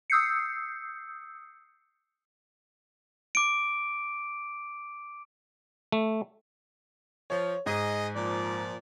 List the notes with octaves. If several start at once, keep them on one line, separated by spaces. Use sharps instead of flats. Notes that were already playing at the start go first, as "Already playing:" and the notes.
D#6 E6 G6 C7 C#7
D6 D7
A3
F3 C#5
G#2 G#4 D#5
A#2 F3 D5